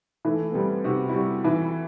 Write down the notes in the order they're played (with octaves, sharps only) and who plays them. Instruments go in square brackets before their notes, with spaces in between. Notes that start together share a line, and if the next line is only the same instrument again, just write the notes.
[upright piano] E3 [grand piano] A3
[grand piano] B3
[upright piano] G3 [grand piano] C4
[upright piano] C3 [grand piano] F#4
[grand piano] E4
[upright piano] G3 [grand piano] F#4
[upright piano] E3